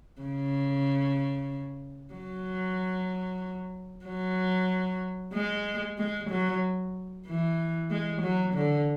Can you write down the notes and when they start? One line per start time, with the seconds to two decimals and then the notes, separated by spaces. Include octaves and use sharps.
0.22 C#3
2.14 F#3
4.05 F#3
5.34 G#3
5.98 G#3
6.30 F#3
7.27 E3
7.90 G#3
8.22 F#3
8.54 D3